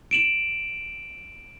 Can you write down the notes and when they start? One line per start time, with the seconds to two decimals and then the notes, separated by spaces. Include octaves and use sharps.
0.11 D7 E7 F#7